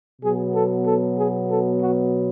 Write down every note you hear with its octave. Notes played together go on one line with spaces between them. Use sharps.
B2 F#3 B3 G#4
A4
A4
G#4
A4
F#4